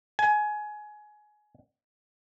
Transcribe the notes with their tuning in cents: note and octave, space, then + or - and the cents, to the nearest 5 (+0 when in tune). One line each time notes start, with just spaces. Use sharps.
G#5 +20